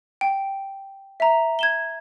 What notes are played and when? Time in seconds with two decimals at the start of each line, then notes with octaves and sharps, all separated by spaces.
0.21 G5
1.20 E5 A#5
1.59 G#6 E7 G7